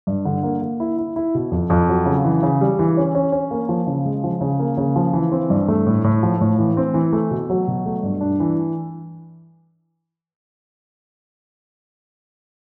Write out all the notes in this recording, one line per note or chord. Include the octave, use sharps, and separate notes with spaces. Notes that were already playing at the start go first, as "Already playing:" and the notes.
G2
D3
A#3
A#3
E4
E4
E4
B2
F2
F2
F#3
C#3
E3
C#3
G3
E3
C#4
C#4
C#4
A#3
F3
C#3
G#3
F3
C#3
A#3
C#3
F3
E3
C4
G2
A3
A2
A2
F3
A2
E3
C4
E3
A3
B2
F#3
B2
A3
G2
D4
E3